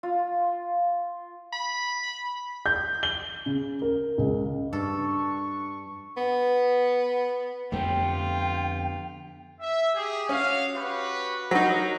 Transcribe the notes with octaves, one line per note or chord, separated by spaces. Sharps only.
F4
B5
G6
G7
C#3
A#4
C#2
G2 D4 A4 C#6
B3
F2 D3 A3 B3 F4 G4 G5
E5
G4 G#4
C#4 F#4 F5
F#4 G4 B4
F#3 D#4 A#4